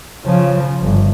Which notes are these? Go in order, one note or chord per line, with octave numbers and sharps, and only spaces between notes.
C#3 F3
G1